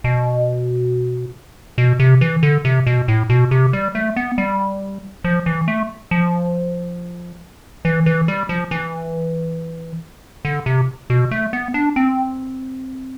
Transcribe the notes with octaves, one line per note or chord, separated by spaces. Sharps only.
B2
B2
C3
E3
D3
C3
B2
A2
B2
C3
G3
A3
B3
G3
F3
E3
A3
F3
E3
E3
G3
F3
E3
D3
C3
B2
A3
B3
D4
C4